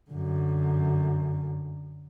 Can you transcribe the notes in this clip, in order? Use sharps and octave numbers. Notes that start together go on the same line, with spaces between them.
F#2 D3